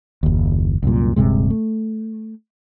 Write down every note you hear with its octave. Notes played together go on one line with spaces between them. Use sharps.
F#1 D#2
C2 F#2 A#2
D#1 G2 C3 G#3
A3